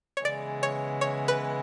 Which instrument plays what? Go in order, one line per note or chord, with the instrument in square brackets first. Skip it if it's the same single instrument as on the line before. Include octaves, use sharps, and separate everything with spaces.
[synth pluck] C#5
[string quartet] C#3 E3 G#3 B3 [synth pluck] D5
[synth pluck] C#5
C#5
B4